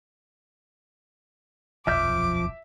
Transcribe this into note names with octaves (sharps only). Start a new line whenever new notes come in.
D#1 B1 F2 F3 E5 D6 F6 G6